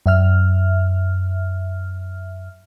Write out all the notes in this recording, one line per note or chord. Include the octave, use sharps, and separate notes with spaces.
F#2 E5 F6